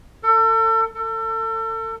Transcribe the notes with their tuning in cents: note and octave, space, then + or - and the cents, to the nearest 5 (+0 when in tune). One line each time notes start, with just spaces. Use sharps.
A4 +35
A4 +35